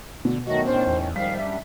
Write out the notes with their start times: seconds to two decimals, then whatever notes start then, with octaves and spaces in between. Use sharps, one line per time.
0.25 B2 D3
0.47 D#3 F#3 A3 F#4 D#5
0.66 A2 D#3 C#4 D4 C5
0.87 E2
1.16 G#2 D#3 F3 G3 F5 B6
1.37 F#2 D4 E5